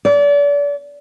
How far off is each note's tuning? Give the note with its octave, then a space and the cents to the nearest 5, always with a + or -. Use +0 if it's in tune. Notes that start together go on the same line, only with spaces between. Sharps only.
D5 -35